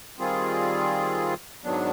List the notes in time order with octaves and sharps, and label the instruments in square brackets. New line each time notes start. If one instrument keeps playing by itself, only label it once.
[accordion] D#3 G3 C4 F4 G#4
G#2 D#3 F#3 B3 D4